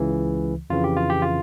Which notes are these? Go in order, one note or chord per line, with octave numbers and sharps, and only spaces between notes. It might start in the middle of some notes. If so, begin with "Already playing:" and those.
Already playing: C#2 C#3 E3
F2 C#3 E3 F4
G4
F4
G4
F4